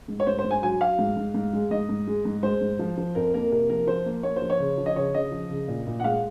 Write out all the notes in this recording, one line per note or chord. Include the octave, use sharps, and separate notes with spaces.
G#2
C#5
G#2 C5
C5
G#2
G#5
F#3 G#5
F#3 F5
G#2
G#2
G#2
G#3
G#2 D#5
G#2
G#3
G#2
G#3 C5
G#2
F3
F3
F2 A#4
A#3 A#4
C3 A#4
F3 A#4
F3 C5
A#3
A#3 C#5
C5
F3
C#5
C#3
F3
D#5
C#3 C#5
C#3 D#5
F3
C#3
A#2
A#2
F#5
G#3 F5